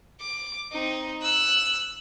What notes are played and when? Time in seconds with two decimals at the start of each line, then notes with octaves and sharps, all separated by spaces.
0.20 D6
0.72 C4 D#4
1.22 E6 F#6